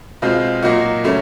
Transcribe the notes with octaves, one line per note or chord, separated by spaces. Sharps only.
B2 G#3 C4 F4
A#2 F#3 A#3 D#4 F#4
C#3 F#3 A3 C#4